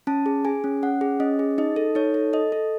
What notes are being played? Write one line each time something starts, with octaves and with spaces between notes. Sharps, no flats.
C#4 A5
G#4
G#4 G#5
C#4
C#4 F#5
G#4
C#4 D#5
G#4
D#4 D#5
A4
D#4 C#5
A4
A4 D#5
A4